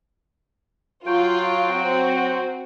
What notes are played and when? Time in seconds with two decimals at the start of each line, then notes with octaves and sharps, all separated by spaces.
1.06 F#3 F4 G5
1.71 C4 F#4